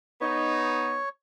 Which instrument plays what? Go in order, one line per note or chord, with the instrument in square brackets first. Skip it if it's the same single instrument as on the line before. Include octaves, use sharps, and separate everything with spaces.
[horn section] B3 D#4 [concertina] C#5